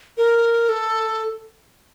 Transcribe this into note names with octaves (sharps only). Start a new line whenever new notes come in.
A#4
A4